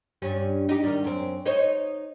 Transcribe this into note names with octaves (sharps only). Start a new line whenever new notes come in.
G2 G3 C#4
D#4 G4
D#3 G3
F#2 C4
D#4 C5 C#5